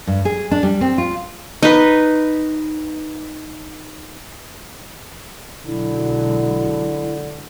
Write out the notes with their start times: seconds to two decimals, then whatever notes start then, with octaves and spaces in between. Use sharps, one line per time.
0.07 G2
0.25 G#4
0.51 D4
0.63 G3
0.81 C4
0.98 F4
1.63 D#4 B4
5.66 B1 D3 F#3 G#3 E4